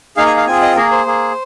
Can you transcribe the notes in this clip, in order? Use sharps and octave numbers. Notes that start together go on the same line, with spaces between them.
A#3 D#4 G#4 F5
G#5
F5
C4 F4 G#4 G#5
D#5
A#3 G#4 A#4
C5
A#3 G#4